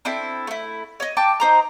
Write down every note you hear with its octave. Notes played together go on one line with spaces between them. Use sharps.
C4 D4 E4 A4
A3 E4
C#5 D#5
G5 A5 D6
D#4 C5 A#5